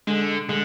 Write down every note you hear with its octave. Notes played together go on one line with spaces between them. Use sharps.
D3 G#3
D3 G#3